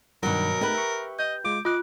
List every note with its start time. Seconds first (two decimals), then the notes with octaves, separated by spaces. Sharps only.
0.23 G2 B2 D#3 F#3 A#4
0.61 A3 D#4 G4 B4
0.75 E5 C#6
1.19 D#5 G6
1.44 G#3 F4 D6
1.65 F4 D#5 D6 F#6